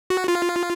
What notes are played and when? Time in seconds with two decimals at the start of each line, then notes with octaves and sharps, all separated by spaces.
0.10 F#4
0.28 F4